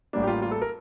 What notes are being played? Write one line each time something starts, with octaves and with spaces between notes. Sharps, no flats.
A1 A2 G3 A#3 D4
G4
F4
F4
A4
A#4